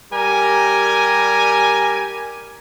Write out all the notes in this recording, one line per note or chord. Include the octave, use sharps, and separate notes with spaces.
G3 G4 A#4 G#5